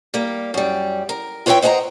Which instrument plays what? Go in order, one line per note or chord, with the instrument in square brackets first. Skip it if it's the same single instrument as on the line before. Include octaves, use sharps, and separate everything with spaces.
[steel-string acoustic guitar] G3 A#3
F#2 G3
A#4
F4 B4 C#5 D5 E5 G5
C5 D#5 F#5 G#5 A#5